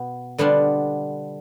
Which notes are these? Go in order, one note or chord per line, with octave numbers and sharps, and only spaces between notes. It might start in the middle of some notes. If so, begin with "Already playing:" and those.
Already playing: B2 B3
D3 G3 B3 D4 F4